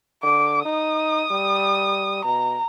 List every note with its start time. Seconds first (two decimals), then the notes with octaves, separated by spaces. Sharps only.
0.23 D3 D6
0.65 D#4 D#6
1.31 G3
2.25 B2 A#5